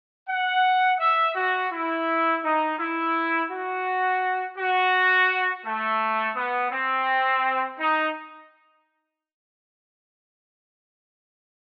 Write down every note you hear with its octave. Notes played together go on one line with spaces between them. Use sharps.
F#5
E5
F#4
E4
D#4
E4
F#4
F#4
A3
B3
C4
D#4